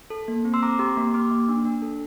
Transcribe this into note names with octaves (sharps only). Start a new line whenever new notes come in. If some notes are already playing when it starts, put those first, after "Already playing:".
A4
A#3
C4
C6 E6
C4 A#5 D6
G4 C6 E6
A#3
G4 D6 F6
A#3
D4
D4
A4